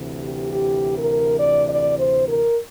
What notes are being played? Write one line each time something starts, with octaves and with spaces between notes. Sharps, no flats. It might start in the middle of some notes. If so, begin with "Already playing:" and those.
Already playing: D2 C3 E3
G4
G4
A#4
D5
D5
C5
A#4